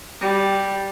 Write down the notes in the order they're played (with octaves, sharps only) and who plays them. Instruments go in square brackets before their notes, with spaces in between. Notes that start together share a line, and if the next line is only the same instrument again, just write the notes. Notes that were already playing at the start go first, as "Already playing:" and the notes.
[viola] G3